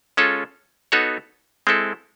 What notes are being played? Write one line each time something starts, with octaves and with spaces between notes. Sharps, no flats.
G#3 C#4 F4 A4
B3 D#4 F#4 A4 C#5
G#3 C4 E4 A4